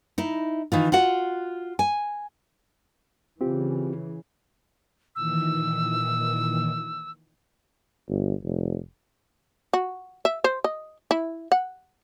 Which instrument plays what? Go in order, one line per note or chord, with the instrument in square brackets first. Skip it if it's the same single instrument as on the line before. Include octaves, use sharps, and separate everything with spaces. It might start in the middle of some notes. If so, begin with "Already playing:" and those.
[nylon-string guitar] D#4 E4
D#3 E3 F4
F4 F#4 F#5
G#5
[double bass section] C#3 E3 [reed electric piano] C4 F4 G4
[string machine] A#2 D#3 E3 [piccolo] E6
[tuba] G1
F1
[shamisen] F#4
E5
C5
D#5
E4
F#5